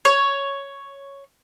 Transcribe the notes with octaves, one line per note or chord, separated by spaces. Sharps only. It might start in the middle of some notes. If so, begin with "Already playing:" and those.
C#5